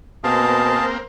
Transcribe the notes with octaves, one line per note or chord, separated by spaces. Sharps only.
B2 A#3 C4 G#4 F5 A5